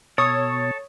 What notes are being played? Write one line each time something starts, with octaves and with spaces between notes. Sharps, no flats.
B2 A4 C#5 D#6